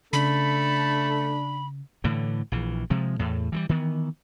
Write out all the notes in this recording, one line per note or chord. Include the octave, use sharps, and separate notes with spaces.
C#3 A3 D4 A4 B5
A2 D3 E3
A#1 E3
C3 F3 G#3
E2 A2
E3 F3 G3
D#3 E3 B3